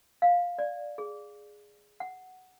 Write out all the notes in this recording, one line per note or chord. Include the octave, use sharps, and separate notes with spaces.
F5
D5
G#4
F#5